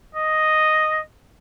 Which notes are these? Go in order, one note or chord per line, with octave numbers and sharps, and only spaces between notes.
D#5